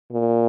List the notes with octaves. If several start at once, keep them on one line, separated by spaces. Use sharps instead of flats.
A#2